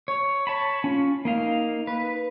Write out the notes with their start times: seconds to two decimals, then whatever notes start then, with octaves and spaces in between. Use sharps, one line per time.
0.08 C#5
0.47 C#5 A5 B5
0.84 C#4 F4
1.25 A#3 D#4 F5
1.87 B4